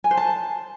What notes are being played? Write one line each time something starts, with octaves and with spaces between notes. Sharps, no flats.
G#5
C5
A5